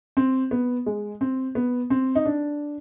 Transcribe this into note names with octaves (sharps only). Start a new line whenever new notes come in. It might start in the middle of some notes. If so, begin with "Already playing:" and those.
C4
B3
G#3
C4
B3
C4
D#4
D4